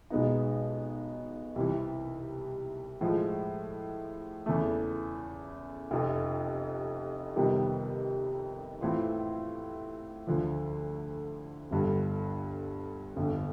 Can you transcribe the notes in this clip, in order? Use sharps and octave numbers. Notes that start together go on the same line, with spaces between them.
B1 B2 G#3 B3 D#4
C2 C3 E3
A2 F3 G#3
E2 C#3 E3 A3
F1 F2 C3
F2 C3 D#3 G3 B3
A2 E3 A3 C4 F4
D2 D3 F3
G1 G2 D3
G1 F2 D3